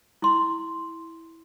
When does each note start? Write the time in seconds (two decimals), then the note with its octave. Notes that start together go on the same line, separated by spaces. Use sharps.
0.22 E4 C6